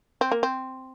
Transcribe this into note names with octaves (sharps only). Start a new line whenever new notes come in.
C4
A#3
C4